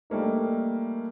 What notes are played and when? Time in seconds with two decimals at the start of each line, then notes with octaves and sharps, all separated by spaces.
0.10 G3 A3 A#3 D#4